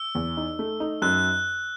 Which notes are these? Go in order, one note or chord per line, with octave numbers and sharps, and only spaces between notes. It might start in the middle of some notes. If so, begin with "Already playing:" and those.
Already playing: E6
E2
D#4
A3
D#4
F#2 F#6